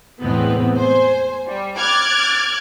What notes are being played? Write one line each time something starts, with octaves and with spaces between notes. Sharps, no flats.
E2 A2 C3 G#3 B3 C4
C5 G#5
G3
D6 F6 F#6 G#6 A6